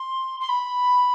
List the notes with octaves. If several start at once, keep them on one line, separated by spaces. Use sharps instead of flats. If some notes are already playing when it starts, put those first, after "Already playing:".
Already playing: C6
C6
B5